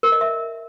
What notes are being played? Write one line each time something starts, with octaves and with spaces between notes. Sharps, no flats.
A#4
D#5
E5